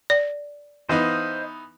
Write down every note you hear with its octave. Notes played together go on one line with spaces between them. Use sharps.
D5
E3 B3 D#4 C5 D#5 F5